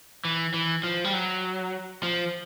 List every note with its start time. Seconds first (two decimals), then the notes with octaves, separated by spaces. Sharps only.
0.25 E3
0.54 E3
0.84 F3
1.04 G3
1.13 F#3
2.03 F3